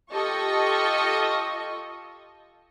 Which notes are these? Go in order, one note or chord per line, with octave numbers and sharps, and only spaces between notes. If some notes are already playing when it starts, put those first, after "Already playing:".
F4 G4 A4 D#5 C#6